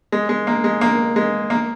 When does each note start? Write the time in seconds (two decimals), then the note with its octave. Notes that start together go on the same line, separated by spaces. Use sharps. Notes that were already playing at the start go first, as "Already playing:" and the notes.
0.12 G#3
0.29 G#3
0.47 A#3
0.64 G#3
0.81 A#3
1.16 G#3
1.50 A#3